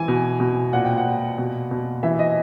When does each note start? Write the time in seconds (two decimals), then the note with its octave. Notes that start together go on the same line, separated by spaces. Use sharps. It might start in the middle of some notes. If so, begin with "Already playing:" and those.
Already playing: E3 G#5
0.08 B2
0.40 B2
0.73 A#2 F#5
0.85 G5
0.97 F#5
1.05 A#2
1.38 B2
1.71 B2
2.03 E3 E5
2.19 D#5